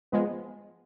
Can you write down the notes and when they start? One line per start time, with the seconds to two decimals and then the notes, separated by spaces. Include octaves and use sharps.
0.12 F3 G#3 B3